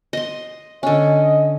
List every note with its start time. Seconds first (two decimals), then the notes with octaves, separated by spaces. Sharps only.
0.13 D#5 C6
0.83 D3 C#4 D#5